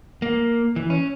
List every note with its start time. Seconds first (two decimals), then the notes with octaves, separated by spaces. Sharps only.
0.22 A#3
0.76 E3
0.90 C#4